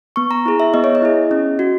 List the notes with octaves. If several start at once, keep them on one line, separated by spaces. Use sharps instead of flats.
B3 C#6
A#5
E4 G#4
E5
B3 D#5
C#5
D#5
E4 G#4
C#4
F#4